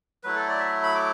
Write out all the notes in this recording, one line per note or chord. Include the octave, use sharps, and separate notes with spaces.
F#3 A3 E4 B4
A4
D5
E5
B5
D6